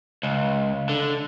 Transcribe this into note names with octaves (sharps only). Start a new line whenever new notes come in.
C#2
D3